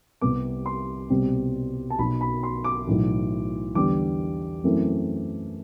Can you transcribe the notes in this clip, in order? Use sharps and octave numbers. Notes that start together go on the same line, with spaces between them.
C2 C3 G3 B3 D6
C6
C2 B2 G3 C4
A5
B1 B2 F#3 B5
B5
C6
D6
B1 A2 E3
E2 D3 G3 B3 D6
F#2 E3 A3 C4